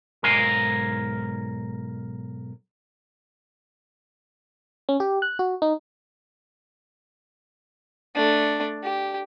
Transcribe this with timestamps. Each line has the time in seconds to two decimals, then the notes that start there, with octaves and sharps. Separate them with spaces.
0.23 B1 G#2 A#4 F5 G#5
4.89 C#4
5.00 G4
5.22 F#6
5.39 F#4
5.62 D#4
8.15 A3 D4
8.83 G4